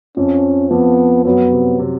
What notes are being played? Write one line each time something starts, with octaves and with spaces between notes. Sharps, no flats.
F2 F3 C#4
F2 F3 B3
F#2 F#3 B3
C3
C3